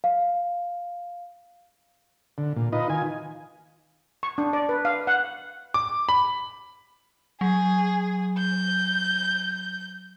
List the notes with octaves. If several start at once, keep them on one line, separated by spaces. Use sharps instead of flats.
F5
D3
A#2
D#4 F4 B4 D#5
D#3 F4 G#5
C#6
D4
D5
B4
F5
F#5
D6
B5
F#3 G#4
G6